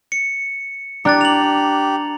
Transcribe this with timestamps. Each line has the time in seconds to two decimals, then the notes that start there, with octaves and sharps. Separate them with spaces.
0.12 C#7
1.05 D4 G4 A#5 D6 F#6 A6
1.21 F7 F#7